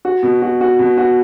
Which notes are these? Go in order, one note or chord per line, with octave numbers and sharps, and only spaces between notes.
F#4
B2
F#4
F#4
B2
F#4